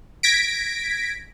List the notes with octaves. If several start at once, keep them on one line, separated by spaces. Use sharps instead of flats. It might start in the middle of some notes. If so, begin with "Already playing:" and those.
G#6 A#6 B6 D7